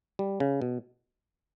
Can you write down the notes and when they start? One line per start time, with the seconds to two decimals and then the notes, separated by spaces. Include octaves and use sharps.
0.19 G3
0.40 C#3
0.62 B2